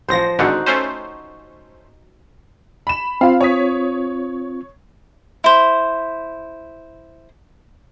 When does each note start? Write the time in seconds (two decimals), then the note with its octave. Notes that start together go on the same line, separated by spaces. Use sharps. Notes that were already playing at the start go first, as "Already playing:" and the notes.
0.09 A1 F3 C5 A#6
0.39 G#1 G#2 D3 D#4 F#4 F#5
0.66 A3 C#4 C5
2.87 B5 E7
3.21 C4 F4 F5 B5
3.41 C#5 D#6 B6
5.44 E4 C5